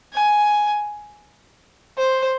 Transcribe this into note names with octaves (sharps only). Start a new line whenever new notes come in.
G#5
C5